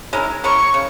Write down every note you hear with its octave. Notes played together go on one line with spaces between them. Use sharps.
G#3 C#4 E4 A#4
G#3 C#4 E4 A#4 C#6
C#3